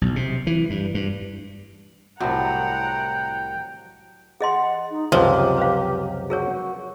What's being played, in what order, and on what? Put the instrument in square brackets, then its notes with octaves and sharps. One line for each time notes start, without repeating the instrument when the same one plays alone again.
[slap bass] B1
C3
E3
G2
G2
[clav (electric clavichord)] C2 A2 C3 [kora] F#3 [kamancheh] F#5 A#5 [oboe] G5
[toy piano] G#4 D#5 C6 [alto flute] F#5
[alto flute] D#4
[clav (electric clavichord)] C#2 F#2 C3 [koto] F3 [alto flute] G4
[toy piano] B4 C5 F5
[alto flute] F#4 [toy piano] G#4 A#4 C#5